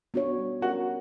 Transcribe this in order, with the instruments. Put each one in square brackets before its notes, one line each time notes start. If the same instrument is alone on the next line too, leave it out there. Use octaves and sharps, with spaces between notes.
[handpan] B3 D4 F#4 C#5
G3
[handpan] C#4 G4 A#4 [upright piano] F#4